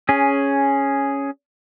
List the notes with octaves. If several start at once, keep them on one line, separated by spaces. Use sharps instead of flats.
C#4 G#4